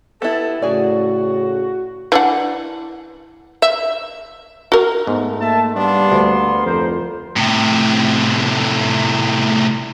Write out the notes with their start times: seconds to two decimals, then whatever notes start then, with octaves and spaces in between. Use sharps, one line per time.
0.22 B3 E4 G4 A4 A5
0.62 A2 C#3 F#4 G#4 D5
2.12 E3 D4 F#5
3.62 E5
4.72 F#4 A#4
5.07 G#2 A3 B3
5.41 A#3 E5 A5
5.76 G3 A#3 B3 D4 C6
6.12 D2
6.65 F2 A2 A#4 C5
7.36 A2 C3